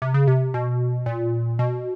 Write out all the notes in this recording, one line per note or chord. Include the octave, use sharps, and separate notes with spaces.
C3
C#3
C3
B2
A#2
B2